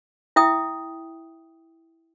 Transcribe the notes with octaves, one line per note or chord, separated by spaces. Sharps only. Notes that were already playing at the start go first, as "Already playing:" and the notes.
E4 E5 G5 D#6